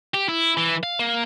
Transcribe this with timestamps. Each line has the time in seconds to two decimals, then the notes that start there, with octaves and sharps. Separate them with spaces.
0.14 G4
0.29 E4
0.57 E3
0.83 F5
0.99 A#3